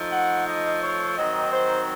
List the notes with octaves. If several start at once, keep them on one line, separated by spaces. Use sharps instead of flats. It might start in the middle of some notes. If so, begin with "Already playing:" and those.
Already playing: F3 A3 D#4
F#5
D#5
C#5
D#3 F#3 C4 D#4 D#5
C5